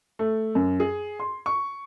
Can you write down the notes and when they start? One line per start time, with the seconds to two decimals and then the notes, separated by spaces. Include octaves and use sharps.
0.19 A3
0.55 F#2
0.80 G#4
1.20 C6
1.46 C#6